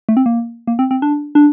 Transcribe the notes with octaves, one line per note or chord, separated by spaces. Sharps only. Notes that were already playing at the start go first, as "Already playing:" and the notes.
A3
C4
A#3
A#3
C4
C4
D4
D4